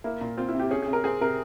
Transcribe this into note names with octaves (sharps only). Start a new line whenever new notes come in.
A#3 E4
A#2
C4 F4
E4
C3 G4
C#4 G#4
G#4
C3
A#4
C4 G#4
C3 A#4